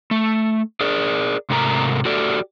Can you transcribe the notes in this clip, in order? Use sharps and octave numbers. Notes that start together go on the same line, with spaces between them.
A3
G#4 A#4 D5
G#2 C3 A3 A#4 A#5
F#4 G4 A4 D5